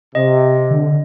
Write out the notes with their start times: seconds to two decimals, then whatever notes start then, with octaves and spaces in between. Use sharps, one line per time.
0.15 C3 D#5
0.71 D3